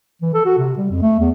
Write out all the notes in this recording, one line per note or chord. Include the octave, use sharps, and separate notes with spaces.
E3
A4
F#4
C3
G3
F2
A3
E2